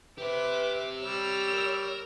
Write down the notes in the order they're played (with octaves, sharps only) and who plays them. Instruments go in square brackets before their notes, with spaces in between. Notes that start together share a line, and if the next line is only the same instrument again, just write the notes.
[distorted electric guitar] G4 C5 [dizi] B4 [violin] E5 D6
[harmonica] G3 [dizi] C#5 [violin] E6 F7
[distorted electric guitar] A#4